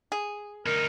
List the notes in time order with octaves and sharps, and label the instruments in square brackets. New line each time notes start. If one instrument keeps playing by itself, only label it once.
[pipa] G#4
[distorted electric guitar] D2 D#4 [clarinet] A#4